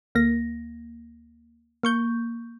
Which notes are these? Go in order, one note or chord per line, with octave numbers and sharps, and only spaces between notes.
D2 A#3 A#6
A#3 C#6 G6